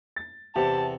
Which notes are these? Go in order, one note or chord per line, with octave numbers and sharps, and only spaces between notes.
A6
E2 C3 G4 A5